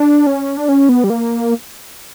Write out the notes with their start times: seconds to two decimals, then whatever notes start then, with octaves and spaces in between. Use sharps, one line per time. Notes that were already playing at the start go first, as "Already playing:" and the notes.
Already playing: D4
0.27 C#4
0.57 D4
0.69 C#4
0.89 B3
1.04 G3
1.10 A#3